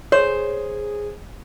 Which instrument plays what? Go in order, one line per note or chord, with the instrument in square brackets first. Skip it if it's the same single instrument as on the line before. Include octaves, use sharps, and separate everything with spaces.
[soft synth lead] G#4 [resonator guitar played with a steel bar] C5 [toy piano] C#5